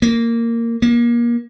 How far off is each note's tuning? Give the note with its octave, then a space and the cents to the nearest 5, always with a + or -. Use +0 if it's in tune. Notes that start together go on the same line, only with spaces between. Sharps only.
A#3 -10
A#3 +30